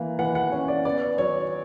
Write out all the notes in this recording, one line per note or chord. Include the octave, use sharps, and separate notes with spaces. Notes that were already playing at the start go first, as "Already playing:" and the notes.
Already playing: E3 A#3
E3 F#5
F#5
C#4
D5
B3 D5
F#3 C#5